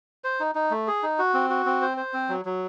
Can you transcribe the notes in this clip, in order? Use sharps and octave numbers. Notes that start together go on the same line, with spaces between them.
C5
D#4
D#4
A3
G#4
D#4
F#4
C4
F#4
C4
C5
C5
C4
F#3
F#3